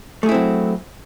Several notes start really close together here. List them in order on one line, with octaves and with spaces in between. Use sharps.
A3 G#4 E4 C4 F#3